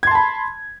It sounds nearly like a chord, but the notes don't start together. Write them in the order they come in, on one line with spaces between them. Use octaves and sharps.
G#6 C6 A5 B5